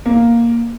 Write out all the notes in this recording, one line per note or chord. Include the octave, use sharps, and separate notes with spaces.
A#3